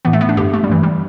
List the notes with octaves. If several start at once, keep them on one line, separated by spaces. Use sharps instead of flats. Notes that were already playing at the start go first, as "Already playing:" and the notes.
A2 E3 B3
A3
B3
D4
G2 D3 G4
A3
G3
G2 E3
G3